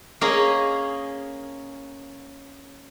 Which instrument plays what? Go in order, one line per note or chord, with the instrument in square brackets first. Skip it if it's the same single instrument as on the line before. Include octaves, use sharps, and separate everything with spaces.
[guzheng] A#3 C#4 G#4 A#4 D#5